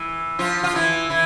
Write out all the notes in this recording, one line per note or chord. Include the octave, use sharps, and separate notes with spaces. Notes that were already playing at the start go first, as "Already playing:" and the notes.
Already playing: E3
F3 F4
F4
E3 E4
E3 E4